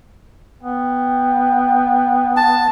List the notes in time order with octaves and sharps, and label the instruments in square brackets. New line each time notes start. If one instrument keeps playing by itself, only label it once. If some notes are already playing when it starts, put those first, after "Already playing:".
[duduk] B3 [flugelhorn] G5
[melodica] A5